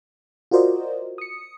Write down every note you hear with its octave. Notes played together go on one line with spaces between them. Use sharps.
F4 F#4 A#4 C5 D5 D#5
D#6 C#7